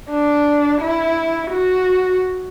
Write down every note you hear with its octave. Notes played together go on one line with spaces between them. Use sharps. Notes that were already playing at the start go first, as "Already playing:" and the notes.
D4
E4
F#4